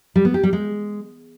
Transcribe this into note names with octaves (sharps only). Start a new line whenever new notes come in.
G3
B3
G4
G3
G#3